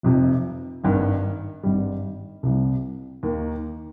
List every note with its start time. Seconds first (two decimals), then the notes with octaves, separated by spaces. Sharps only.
0.03 F1 F2 C3 F3
0.84 G#1 G2 D#3
1.63 G#1 G2 G3
2.43 C2 C3 G3
3.23 D#2 D#3 A#3